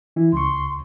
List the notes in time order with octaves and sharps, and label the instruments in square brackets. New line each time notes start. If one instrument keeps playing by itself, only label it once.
[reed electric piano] E3 E4
[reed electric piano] C#2 C#6 [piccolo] C6